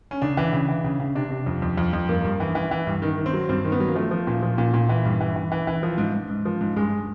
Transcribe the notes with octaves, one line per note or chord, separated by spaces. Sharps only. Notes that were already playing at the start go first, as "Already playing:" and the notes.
C#4
C#3 D4
E3
C#3
E3
C#3
C#3
C3 D4
C3
F2
F2
F2
F2
G2 A#3
G2
E3
E3
E3
G2
D#3
D#3
C4
F#3
G2 C4
D#3
B3
F#3
A#3
F3 A3
F3
A#2
F3
A#2
A#2
E3
G2
E3
E3
E3
E3
F3
G#2
G#2
G#2
F3
G#2
G2 G#3